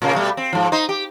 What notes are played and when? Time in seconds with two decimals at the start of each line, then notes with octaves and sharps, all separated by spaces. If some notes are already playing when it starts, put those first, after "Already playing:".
0.02 A#2 C#3 A#3
0.15 B2 G3 A3
0.37 C4
0.53 G#2 F3
0.72 D#4 C5
0.89 G4